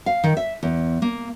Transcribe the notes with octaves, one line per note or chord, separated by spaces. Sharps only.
F5
D#3
E5
E2
A#3